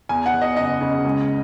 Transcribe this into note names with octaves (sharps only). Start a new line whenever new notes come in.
E2 G#5
F#5
E2
D#5
F#1 D#5
C#3
C#2